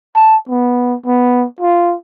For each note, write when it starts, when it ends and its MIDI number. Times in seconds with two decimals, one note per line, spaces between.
0.16 0.36 81
0.49 0.95 59
1.06 1.46 59
1.60 1.95 65